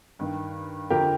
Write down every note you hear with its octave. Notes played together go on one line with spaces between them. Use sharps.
G2 D#3
F2 D3 F3 G4 A#4